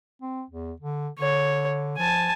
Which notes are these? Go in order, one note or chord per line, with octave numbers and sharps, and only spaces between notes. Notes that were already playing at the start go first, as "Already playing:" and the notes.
C4
E2
D3
D3 C#5
F3 G#5 A5